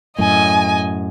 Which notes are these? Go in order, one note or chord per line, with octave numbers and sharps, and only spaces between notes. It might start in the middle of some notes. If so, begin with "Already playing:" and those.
F#2 A2 D#5 G#5